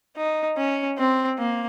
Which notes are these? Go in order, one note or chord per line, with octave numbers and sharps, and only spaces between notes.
D#4
C#4
C4
A#3